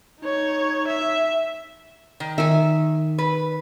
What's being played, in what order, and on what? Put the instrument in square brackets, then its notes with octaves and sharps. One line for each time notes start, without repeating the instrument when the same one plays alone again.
[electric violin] D#4 C#5
E5
[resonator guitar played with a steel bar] D#3
[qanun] D#3 G#5 [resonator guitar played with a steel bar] E5
[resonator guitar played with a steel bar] B4